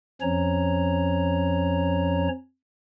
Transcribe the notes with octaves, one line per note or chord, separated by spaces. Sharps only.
F2 F3 C#4 C#5 A#5